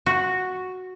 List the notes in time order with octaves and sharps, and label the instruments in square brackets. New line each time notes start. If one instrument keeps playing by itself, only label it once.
[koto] F#4